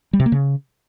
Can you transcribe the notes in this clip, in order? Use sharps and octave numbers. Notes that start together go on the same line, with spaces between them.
G3
C3
A#3
C#3